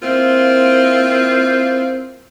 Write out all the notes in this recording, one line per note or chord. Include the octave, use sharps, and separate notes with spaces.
A#3 C4 E4 F4